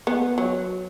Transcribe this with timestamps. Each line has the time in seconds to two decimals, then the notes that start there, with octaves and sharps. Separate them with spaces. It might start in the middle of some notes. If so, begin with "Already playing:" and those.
0.07 B3
0.38 F#3